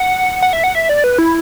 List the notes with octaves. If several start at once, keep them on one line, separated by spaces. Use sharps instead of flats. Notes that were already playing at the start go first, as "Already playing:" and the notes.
Already playing: F#5
F#5
E5
F#5
E5
D5
B4
E4